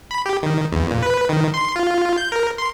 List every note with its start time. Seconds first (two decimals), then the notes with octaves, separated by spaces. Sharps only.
0.11 B5
0.26 G4
0.43 D#3
0.72 E2
0.91 A#2
1.03 B4
1.29 D#3
1.54 C6
1.76 F4
2.18 G6
2.32 A#4
2.58 C6